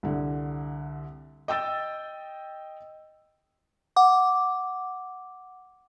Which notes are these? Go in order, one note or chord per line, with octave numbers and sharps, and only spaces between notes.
C2 D3
D#5 G5 E6 A6
F#5 D6